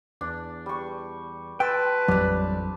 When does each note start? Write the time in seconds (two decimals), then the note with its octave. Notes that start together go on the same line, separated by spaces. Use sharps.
0.21 E2 D4
0.66 G3 C#6
1.60 B4 G5 A5 C6 E6
2.08 A1 F2 F#3 G3 D4